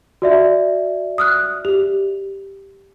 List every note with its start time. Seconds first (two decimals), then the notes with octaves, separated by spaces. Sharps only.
0.22 F#4 D5 E5
1.18 D#6 F6 F#6
1.65 G4